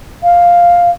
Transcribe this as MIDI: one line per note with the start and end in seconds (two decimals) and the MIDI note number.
0.23 0.90 77